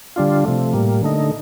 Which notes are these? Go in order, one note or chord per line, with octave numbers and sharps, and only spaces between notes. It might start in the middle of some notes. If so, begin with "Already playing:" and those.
D3 G3 D4 F4
C3 F3 A3
A2 G3 A#3
D3 A3 D#4